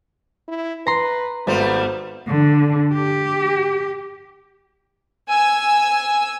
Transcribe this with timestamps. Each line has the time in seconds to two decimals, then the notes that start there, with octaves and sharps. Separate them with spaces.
0.48 E4
0.87 B4 A#5 C6
1.47 G#1 G3 A3 B3 C5
2.27 D3
2.94 G4
5.28 G#5 E6